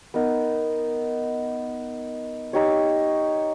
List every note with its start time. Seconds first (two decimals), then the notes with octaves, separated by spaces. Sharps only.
0.14 B3 D#4 A#4
2.53 D#4 G4 C#5